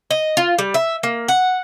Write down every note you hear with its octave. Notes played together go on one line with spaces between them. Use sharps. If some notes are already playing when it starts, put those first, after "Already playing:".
D#5
F4
G3
E5
A#3
F#5